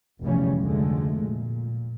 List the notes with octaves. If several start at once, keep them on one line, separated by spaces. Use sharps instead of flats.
F1 B1 C#3 E3 G3 C#4
F1 D2 D3 G#3 A3
A#2